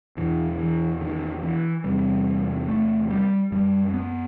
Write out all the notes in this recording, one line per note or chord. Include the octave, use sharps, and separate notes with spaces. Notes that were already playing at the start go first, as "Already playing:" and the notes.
E2 B2 E3
E3
D#3
E3
E2 C3 G3
A3
G3
F#2 G3
B3